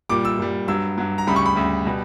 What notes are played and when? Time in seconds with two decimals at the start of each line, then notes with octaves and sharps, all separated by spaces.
0.09 A#2 G3 D6
0.25 E6
0.39 A#2 G3
0.68 G2 F#3 E6
0.98 G2 F#3
1.18 A#5
1.27 D2 C#3 G3 B5
1.36 C#6
1.46 B5
1.56 D2 C#3 G3
1.86 B2 G3